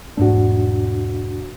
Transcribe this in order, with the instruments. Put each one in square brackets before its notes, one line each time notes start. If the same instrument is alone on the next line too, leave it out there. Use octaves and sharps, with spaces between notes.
[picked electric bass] E1 G#2 A3 [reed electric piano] D4 F#4